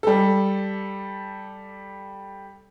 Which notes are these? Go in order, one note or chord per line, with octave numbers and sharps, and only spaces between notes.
G3 A4